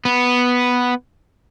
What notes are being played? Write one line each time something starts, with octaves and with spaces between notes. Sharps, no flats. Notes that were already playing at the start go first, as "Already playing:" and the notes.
B3